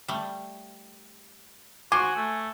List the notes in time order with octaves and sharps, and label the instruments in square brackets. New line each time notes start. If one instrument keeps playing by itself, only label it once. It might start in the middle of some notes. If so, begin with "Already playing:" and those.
[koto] G3 A3
[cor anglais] F#4 [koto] C5 [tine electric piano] G#5 [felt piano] D6
[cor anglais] A3